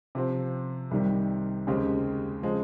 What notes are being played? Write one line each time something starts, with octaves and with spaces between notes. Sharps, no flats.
C3 F3 C4
C2 C3 D#3 G3
D#2 C#3 G#3 C4 G4
C#3 F3 G#3 C4